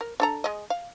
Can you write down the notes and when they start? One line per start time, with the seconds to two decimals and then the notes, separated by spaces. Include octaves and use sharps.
0.01 A#4
0.20 D4 A4 A#5
0.44 G#3 D#5
0.70 F5